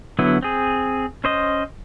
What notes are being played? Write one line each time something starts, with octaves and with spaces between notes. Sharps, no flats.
D3 F#3 B3 E4
C4 G#4
C#4 C5 D#5